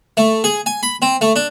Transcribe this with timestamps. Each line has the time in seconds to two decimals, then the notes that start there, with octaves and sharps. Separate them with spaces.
0.17 A3
0.44 G#4
0.66 G#5
0.83 B5
1.02 C4
1.21 A3
1.36 D4